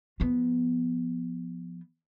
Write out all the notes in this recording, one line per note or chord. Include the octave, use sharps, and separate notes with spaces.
F3 B3